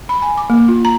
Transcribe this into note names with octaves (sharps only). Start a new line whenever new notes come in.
B5
G#5
D6
A#3
F4
A#5